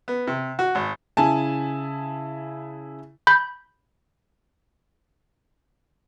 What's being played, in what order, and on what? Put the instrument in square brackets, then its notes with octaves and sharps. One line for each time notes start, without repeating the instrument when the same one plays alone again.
[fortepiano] B3
C3
F#4
G#1
[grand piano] C#3 E4 G#5 A5
[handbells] B5 G6